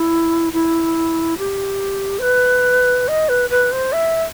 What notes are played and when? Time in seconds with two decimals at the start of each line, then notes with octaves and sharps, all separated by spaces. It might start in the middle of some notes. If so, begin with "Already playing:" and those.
Already playing: E4
0.53 E4
1.38 G4
2.19 C5
2.22 B4
3.08 D#5
3.29 B4
3.50 B4
3.72 C5
3.93 E5